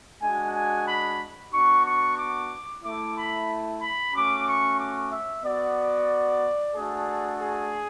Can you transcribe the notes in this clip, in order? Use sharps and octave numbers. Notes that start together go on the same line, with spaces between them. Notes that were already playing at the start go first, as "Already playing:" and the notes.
G#3 D4 F#4 G#5
G#5
B5
B3 D4 F#4 C#6
C#6
D6
A3 E4 D6
B5
B5
A3 C#4 F#4 D6
C#6
D6
E5
B3 F#4 D5
A3 D4 F#4 G#4
G#4